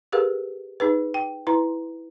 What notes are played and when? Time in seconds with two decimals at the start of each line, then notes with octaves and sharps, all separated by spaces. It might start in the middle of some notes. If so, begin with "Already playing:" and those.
0.12 G4 G#4 A#4 B4 F5 F#5
0.80 D#4 G#4 B4
1.14 G5
1.47 E4 B4 A#5 C6